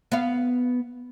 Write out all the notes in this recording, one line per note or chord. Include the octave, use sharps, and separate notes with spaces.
B3 F5